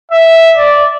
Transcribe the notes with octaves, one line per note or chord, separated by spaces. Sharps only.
E5
D5